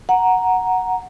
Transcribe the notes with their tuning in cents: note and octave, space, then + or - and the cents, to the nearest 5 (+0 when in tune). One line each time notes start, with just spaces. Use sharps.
F#5 +0 A#5 +0